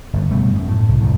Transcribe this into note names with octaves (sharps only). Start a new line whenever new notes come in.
G1 F#2
B2 G3 A3
F#2
A2
C2
C2 F2 A2